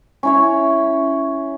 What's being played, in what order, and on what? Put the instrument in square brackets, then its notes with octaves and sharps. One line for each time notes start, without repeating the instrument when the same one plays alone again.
[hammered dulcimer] C#4 E4 C#5